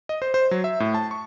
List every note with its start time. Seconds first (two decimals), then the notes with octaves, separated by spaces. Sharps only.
0.09 D#5
0.22 C5
0.34 C5
0.51 F#3
0.64 E5
0.80 A2
0.94 A5
1.11 C#6